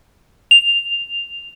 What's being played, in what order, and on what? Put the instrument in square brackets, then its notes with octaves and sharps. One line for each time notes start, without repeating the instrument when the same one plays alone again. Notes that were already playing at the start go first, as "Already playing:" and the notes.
[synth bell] F7